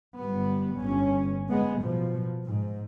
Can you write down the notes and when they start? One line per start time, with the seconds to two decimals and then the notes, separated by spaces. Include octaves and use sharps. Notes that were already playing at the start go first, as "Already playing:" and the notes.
0.19 G1 G3 B3
0.78 G1 G2 C#4
1.50 G#3 B3
1.81 B2 F3
2.46 G#2